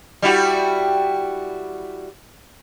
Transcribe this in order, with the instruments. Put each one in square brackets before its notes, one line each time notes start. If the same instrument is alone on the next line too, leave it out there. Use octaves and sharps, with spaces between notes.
[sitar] G3 E4 F#4